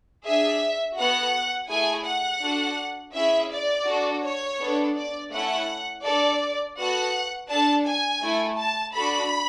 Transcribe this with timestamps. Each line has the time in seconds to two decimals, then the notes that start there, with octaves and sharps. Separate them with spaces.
0.25 D4 G#4 E5
0.97 B3 F#4 A4 F#5
1.69 A3 E4 G#4 G#5
2.06 F#5
2.42 D4 F#4 A4
3.15 C#4 E4 G#4 E5
3.51 D5
3.87 D4 F#4 A4
4.24 C#5
4.59 B3 D4 A4
4.96 D5
5.32 A3 C#4 E4 A4 F#5
6.04 D4 A4 D5
6.76 B3 F#4 A4 F#5
7.49 D4 A4 A5
7.85 G#5
8.21 A3 E4 A4
8.58 A5
8.94 D4 F#4 A4 B5